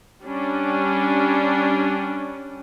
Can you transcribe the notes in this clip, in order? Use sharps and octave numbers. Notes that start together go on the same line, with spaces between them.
G3 C#4 D4